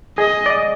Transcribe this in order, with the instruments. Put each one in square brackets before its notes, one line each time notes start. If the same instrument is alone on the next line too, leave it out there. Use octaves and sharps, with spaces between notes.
[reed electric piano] G#4 [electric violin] D#5
[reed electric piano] D5
D#5